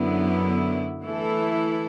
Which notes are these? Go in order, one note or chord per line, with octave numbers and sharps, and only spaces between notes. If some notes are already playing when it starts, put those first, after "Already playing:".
Already playing: F#2 D3 F#3 B3 E4
E3 A3 E4 A4